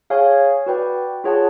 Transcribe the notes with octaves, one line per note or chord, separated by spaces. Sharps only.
G#4 C#5 F5 G#5
F#4 B4 D5 G5
F4 G#4 C#5 F#5 A5